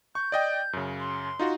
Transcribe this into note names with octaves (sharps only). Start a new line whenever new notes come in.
C#6 G6
D5 D#5 G5
F#2 C#3
C6
D#4 F4 F#4